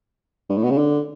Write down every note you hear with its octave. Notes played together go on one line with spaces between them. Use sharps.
G2
A2
B2
C#3
D3